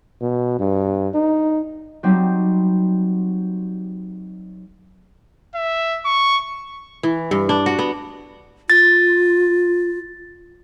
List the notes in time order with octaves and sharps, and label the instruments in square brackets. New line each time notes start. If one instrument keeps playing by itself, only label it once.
[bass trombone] B2
G2
D#4
[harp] F#3 G3 C4 D#4
[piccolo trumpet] E5
C#6
[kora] E3
G2
D4
F#4
B3
[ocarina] F4 [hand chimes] A6